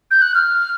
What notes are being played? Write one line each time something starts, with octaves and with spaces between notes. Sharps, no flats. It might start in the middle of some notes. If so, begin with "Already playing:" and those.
G6
F#6
F6